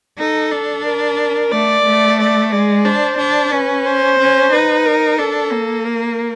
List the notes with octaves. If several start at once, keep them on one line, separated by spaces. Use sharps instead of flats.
D#4 A4
D4
A#4
A3 D5
A3
D5
G#3 D5
D4 C5
D4
C#4 B4
C5
C#4
D#4 B4
A#4
D4 A4
A#3
A#4